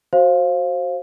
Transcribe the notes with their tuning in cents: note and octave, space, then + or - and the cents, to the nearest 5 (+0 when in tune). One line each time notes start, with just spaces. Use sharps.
F#4 +5 C5 +20 F5 +0